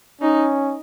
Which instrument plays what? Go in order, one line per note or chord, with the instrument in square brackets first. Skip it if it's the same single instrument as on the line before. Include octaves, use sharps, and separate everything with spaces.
[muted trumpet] C#4 [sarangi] D#4